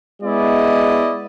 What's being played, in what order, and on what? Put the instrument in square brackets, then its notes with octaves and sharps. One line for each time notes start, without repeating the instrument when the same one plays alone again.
[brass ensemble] G#3 B3 E4 D5 D#5